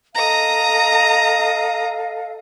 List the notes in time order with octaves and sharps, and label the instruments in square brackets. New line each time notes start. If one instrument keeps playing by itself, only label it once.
[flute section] A4 D#5 F5 [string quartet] A#5 D#6